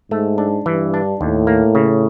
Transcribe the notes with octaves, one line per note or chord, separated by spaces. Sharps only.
G#2 A3
D4
G2 E3
D4
D#2 A2
A#3
C#3